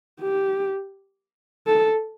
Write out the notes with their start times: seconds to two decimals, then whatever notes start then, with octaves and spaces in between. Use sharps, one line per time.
0.21 G4
1.67 A4